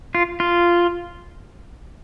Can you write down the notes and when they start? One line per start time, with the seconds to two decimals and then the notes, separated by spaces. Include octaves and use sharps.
0.15 F4
0.40 F4